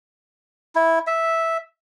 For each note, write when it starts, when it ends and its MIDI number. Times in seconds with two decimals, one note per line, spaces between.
0.76 0.99 64
1.07 1.57 76